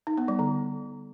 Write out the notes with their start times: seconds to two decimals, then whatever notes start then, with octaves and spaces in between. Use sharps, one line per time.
0.07 D#4
0.18 B3
0.28 G3
0.39 D3